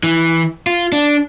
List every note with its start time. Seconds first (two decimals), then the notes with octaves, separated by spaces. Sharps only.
0.03 E3
0.67 F4
0.92 D4